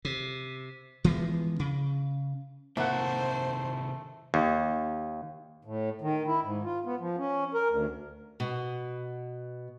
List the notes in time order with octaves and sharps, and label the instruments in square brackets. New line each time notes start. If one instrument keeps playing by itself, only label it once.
[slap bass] C3
E3 F3 G#3 B3
C#3
[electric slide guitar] C3 D#3 E4 [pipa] A3 [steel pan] A#3 F#5 [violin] C5
[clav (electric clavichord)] D#2
[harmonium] A2
D#3
E4
G#2
F4
B3
F3
C#4
A#4
D2
[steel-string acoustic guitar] B2